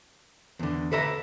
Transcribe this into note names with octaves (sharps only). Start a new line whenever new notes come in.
E2 D3
A4 B4 E5 A#5